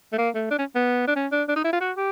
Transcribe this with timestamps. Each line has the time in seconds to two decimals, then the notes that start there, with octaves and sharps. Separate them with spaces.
0.12 A3
0.18 A#3
0.34 A3
0.50 D4
0.59 C#4
0.75 B3
1.07 D4
1.15 C#4
1.32 D4
1.48 D4
1.56 D#4
1.64 E4
1.73 F4
1.81 F#4
1.97 G4